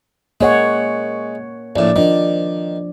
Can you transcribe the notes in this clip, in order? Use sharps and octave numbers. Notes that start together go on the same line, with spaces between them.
G#3 A#3 C#5 F#5
A#1 A2 D5
D#3 F3 D4